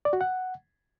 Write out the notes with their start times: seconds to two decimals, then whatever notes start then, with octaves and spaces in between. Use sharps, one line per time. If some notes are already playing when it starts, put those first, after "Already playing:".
0.05 D5
0.13 F#4
0.21 F#5